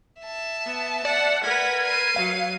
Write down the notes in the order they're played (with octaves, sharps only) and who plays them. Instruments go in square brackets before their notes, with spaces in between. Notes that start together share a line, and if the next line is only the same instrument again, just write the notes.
[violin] E5 A5
[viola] B3
[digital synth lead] D5 [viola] F#5
[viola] A#4 B4 [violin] F#5 B6 [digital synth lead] G#6
[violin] C7 D#7
[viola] F#3 [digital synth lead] F5